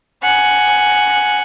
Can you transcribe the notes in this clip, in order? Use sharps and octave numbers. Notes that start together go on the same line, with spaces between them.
F#5 G#5